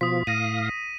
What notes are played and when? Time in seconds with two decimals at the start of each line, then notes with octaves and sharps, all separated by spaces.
0.01 B2 F3 F4 D#6 B6
0.27 A2 F5 D#6 A#6 D#7